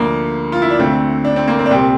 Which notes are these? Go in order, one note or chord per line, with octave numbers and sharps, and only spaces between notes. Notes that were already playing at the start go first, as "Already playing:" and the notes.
Already playing: D2 D3 F3 A#3
F4
E4
D4
D2 D3 A3 C4
D4
C4
A#3
C4
D4
C2 A#2 G3 C4